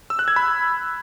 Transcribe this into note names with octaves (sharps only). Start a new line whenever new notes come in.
E6
F#6
G#6
B5